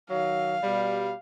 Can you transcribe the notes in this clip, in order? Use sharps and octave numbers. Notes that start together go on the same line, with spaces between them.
D#3 F#3 F5
B2 G3